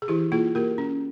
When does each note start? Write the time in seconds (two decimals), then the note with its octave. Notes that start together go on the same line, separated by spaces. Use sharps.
0.02 G#4
0.08 E3 E4 G4
0.32 A#3 F4 G#4
0.55 A#3 G4 A#4
0.78 C#4